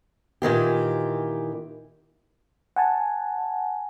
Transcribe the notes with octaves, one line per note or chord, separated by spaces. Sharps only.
A#2 D#3 E3 G4
F#5 G#5 A5